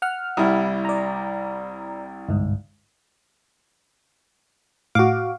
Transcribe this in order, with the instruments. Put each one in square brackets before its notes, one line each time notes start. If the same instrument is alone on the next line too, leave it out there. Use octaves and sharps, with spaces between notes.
[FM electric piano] F#5 F6
[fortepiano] C2 G3 E4
[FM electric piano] D5 A#5
G1 C2 G#2
[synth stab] A2 D6 [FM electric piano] F#4 F5